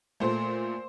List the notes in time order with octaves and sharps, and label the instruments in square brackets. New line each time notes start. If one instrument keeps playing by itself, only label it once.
[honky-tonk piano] A#2 A3 C5